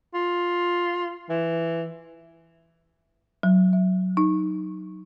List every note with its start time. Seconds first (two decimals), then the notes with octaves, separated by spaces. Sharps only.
0.14 F4
1.29 E3
3.43 F#3
3.73 E5
4.17 D#4